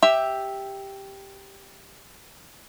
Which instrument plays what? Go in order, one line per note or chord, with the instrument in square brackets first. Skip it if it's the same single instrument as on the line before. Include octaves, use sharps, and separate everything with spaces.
[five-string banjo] G4 E5